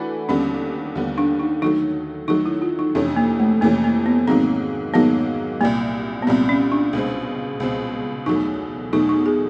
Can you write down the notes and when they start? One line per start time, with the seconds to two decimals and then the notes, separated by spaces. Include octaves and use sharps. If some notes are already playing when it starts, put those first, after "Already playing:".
Already playing: E3 A3 D4 F#4 B4
0.29 D#2 D3 G3 B3 C#4
0.95 D#2 D3 G3 B3
1.18 D4
1.39 D#4
1.62 D#3 F#3 A3 D#4
2.28 D#3 F#3 A3 D#4
2.46 E4
2.62 F4
2.79 D#4
2.95 F2 C3 E3 A3 C#4 D4
3.16 A#3
3.40 A3
3.61 F2 C3 E3 A3 A#3 C#4
3.84 A#3
4.06 B3
4.27 G#2 D#3 F#3 A#3 C4
4.94 G#2 D#3 F#3 A#3 B3
5.61 C2 A#2 G3 A#3
6.22 B3
6.27 C2 A#2 G3 C4
6.49 C#4
6.72 D4
6.93 C#2 B2 G#3 C4
7.60 C#2 B2 G#3 C4
8.26 E2 B2 F#3 A3 D#4
8.93 E2 B2 F#3 A3 D#4
9.09 D#4
9.26 G#4